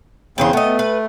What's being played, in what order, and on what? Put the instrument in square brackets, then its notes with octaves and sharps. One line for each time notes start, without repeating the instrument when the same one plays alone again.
[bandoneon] E2 C#3 [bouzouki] C4 G#4 C5
[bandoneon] A3 [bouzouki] B3 D#5
[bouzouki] B4